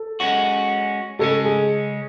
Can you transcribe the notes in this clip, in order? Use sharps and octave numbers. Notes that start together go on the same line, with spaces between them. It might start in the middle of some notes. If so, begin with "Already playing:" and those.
Already playing: A4
G#3 C#4 F#4
C#3 G#3 C#4 A4
G#4